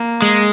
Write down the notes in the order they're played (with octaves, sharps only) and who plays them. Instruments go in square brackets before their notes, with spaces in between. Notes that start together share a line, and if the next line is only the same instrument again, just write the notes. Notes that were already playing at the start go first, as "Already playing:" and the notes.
Already playing: [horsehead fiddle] A#3
[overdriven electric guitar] G#3